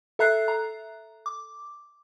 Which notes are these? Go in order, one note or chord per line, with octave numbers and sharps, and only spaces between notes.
A4 E5 A#5 F#6 C7
A#5
D6